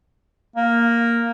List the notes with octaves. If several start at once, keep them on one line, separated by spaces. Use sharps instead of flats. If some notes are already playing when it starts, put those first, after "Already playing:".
A#3